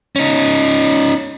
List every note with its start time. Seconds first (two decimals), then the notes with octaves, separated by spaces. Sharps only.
0.16 C#4 D#4